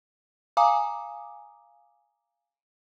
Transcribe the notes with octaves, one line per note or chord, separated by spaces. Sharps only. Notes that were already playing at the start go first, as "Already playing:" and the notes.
F5 G#5 A#5 D6 D#6